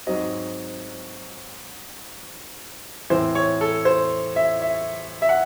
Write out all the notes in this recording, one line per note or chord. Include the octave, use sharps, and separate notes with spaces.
G#2 F#3 C4 D#5
A2 E3 C4 C5
C#5
A4
C5
E5
E5
E5
F#5